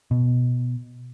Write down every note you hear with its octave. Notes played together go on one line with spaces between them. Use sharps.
B2